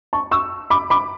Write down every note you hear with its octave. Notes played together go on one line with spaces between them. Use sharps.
A5 C#6
C#6 E6
B5 D6
B5 D6